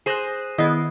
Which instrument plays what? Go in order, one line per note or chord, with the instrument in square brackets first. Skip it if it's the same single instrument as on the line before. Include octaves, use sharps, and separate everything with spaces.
[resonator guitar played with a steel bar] G#4 C5 [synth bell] F#6 A#6 C7
[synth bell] D#3 C7 [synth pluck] B3 E4 [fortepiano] D#5